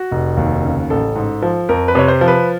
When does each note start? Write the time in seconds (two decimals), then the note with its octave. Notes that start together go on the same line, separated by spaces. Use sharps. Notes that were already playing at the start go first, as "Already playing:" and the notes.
Already playing: F#4
0.11 F1
0.37 D#2
0.64 C#3
0.90 A1 A4
1.16 G#2
1.42 F3
1.69 F2 A#4
1.88 B4
1.95 C3 C#5
2.08 C5
2.21 F3
2.28 B4